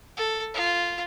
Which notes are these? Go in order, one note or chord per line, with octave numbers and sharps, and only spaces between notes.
A4
F4